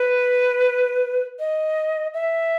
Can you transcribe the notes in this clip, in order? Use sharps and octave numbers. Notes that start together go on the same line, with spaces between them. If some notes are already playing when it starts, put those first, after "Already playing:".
Already playing: B4
D#5
E5